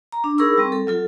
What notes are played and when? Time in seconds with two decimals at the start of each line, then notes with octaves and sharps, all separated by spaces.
0.12 A#5
0.24 D4
0.38 D#4 G#4 A#4 B5 C#6 E6
0.58 G3 C4
0.72 A4
0.87 F#3 F4 A4